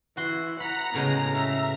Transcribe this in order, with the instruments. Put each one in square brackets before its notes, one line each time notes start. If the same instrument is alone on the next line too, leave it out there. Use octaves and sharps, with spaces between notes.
[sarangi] E3 [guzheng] F#4 C6
[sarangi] F#5 [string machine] A#5 [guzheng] B5
[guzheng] A2 C#3 G#3 [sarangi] B3
[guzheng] C#3 [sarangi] E5